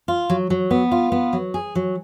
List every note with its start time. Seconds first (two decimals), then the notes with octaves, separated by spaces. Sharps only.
0.08 F4
0.30 F#3
0.50 F#3
0.71 B3
0.92 F4
1.12 B3
1.33 F#3
1.54 G#4
1.75 F#3